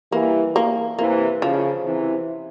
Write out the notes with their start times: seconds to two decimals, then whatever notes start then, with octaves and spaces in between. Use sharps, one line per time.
0.12 E3 G3 A#3
0.56 A#3
0.98 C3 E3 A#3
1.42 C#3 F3
1.85 C3 E3